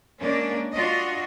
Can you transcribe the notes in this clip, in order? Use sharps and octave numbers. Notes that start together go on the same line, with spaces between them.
G#3 A#3 C#4 D4 D5
D4 F4 F#4 D#5